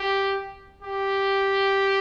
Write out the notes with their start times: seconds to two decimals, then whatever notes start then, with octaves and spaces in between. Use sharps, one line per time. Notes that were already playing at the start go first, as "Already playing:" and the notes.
Already playing: G4
0.83 G4